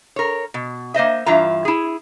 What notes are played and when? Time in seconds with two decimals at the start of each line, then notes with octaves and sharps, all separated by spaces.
0.16 A#4 C#5
0.54 B2
0.94 A#3 C5 D#5 E5
1.26 G2 E3 F4 E5 A#5
1.65 E4 G#4